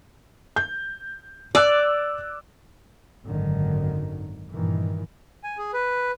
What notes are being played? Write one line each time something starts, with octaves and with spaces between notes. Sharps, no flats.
G6
D5 D6 E6 F#6
G#1 F#2 D3 D#3 F#3
G2 A#2 D#3 E3
G#5
G#4
B4